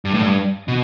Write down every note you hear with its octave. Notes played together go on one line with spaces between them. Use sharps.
G2
A2
G2
B2